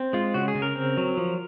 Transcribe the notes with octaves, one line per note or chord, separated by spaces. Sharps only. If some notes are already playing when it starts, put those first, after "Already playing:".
Already playing: C4
G#3 F4
C#3 F#4
G#4
C#3
A#4
C4
F#3
F3